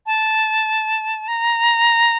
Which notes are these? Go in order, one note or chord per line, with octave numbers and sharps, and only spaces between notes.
A5
A#5